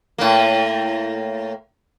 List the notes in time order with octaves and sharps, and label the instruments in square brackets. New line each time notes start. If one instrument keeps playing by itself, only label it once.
[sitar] A2 A#3